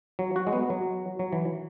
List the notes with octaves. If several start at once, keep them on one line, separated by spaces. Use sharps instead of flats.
F#3
F#4
G#3
B3
F#3
F#3
E3